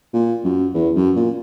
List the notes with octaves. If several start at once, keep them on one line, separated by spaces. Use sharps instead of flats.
A#2
F#2
E2
F#2
A#2